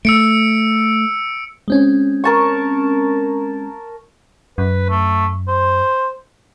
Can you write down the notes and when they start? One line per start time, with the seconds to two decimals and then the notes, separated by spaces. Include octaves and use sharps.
0.05 A3 E6 C#7 D7
1.68 G#3 C4 C#4
2.24 A#4 A5 C#6
4.58 F#2 B4
4.89 A3
5.48 C5